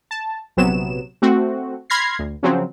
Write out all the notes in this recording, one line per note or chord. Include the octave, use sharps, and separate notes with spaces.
A5
A#1 C3 F#3 B3 E7
A3 C4 F#4
B5 C6 F6 G#6 A#6 C7
D2
C#3 F3 F#3 C4 C#4